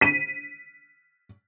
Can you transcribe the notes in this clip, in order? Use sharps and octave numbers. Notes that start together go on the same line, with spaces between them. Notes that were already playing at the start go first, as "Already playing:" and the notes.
B6 D#7